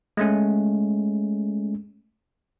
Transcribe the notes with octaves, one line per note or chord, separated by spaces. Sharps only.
G#3 A3 C#4